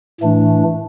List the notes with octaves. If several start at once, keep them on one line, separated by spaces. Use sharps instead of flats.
A2 E3 A3 D4